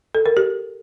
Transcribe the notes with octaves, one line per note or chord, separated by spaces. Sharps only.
A4
A#4
G4